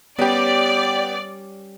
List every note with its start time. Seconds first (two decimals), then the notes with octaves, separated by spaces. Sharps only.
0.18 G3 B3 C#4 G4 A#4 D5